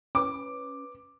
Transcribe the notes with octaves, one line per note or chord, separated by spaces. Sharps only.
C#4 B4 D6